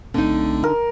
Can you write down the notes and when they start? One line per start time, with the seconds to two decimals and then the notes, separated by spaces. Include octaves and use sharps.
0.14 B1 D3 A3 C4 D#4
0.64 A#4